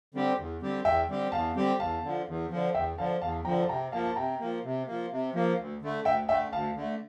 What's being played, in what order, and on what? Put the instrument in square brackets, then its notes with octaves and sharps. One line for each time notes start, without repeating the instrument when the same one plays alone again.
[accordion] D3 G3 C4 G4
E2
D3 G3 C4 G4
[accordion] E2 [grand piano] E5 G5
[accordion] D3 G3 C4 G4
[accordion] E2 [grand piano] F5 A5
[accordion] D3 G3 C4 G4
[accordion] E2 [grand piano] F5 A5
[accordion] D3 F3
E2
D3 F3
[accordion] E2 [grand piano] E5 G5
[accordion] D3 F3 [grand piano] F5 A5
[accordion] E2 [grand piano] F5 A5
[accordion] D3 F3 [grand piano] G5 A#5
[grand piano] A5
[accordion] C3 [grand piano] G5 A#5
[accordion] F3 A#3 [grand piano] F5 A5
[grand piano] A5
[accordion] C3 [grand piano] G5 A#5
[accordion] F3 A#3
C3
F3 A#3
C3
F3 A#3
D2
D3 A3
[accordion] D2 [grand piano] E5 G5
[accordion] D3 A3 [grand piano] E5 G5
[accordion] D2 [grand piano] F5 A5
[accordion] D3 A3